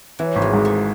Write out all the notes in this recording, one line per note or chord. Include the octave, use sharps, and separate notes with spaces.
E3 F#3
G#1
G#3
G#2
A3